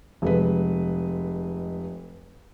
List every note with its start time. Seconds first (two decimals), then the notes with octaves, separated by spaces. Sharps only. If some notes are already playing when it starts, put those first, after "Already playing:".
0.22 F1 G#3 B4